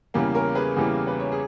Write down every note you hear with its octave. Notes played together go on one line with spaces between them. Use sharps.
E2 C#3 E3 G3 A#3
A#4 C#5
G#4 B4
E2 C#3 E3 G3 A#3
B4
C#5
G#4